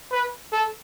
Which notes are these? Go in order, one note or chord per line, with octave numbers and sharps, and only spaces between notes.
B4
A4